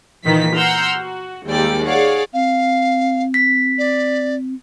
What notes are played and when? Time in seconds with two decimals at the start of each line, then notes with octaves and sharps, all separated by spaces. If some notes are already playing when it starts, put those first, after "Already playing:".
0.25 A#2 D#3 E3 D#4 B6
0.56 F#5 A#5 C6 E6 F6 G6
0.98 F#4
1.47 D#2 G3 G#3 D5 G5
1.85 G#4 C#5 D5 F5 F#5
2.34 C4 F5
3.34 B6
3.78 D5